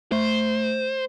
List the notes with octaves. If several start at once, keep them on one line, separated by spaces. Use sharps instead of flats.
A3 C5